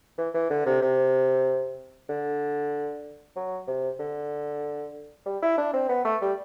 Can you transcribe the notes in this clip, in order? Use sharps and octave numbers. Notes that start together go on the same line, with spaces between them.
E3
E3
D3
C3
C3
D3
F#3
C3
D3
G3
E4
D4
C4
B3
A3
G3